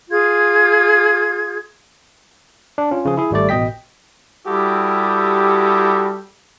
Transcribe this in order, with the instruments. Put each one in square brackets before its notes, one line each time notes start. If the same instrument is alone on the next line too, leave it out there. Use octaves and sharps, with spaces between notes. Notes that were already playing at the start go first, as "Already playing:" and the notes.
[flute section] F4 G#4 G#6
[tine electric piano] D4
C#4 F4
C#3 F3 G#4
E4 G#4
G#1 G3 A3 D5
A1 B2 D#5 G5 B6
[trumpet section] G3 E4 F#4 G4 A4 D#6